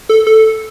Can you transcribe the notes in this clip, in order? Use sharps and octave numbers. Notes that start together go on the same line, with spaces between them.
A4
A4